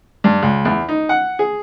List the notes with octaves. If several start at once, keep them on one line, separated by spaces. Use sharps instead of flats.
G2
C#2
E2
D#4
F#5
G#4